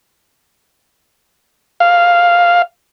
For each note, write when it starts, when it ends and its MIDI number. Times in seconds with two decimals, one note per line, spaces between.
1.80 2.62 77